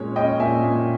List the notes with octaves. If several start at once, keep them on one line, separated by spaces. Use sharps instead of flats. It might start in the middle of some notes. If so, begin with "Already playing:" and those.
Already playing: A#2 G#3 C#4 C#5
C#4 D#5 G5
A#2 E5 G#5
A#2